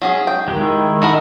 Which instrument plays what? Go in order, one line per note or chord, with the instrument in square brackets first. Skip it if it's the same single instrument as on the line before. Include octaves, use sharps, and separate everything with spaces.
[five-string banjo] F#3 C#4 G#4
G5
[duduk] D#3 [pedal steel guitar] G#3 G4
[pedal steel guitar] G#3 E4
[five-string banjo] D#4 E4 A#4 [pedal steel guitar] A4 F#5 B5